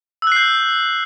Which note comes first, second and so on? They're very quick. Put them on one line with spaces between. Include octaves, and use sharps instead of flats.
E6 F#6 C7 G6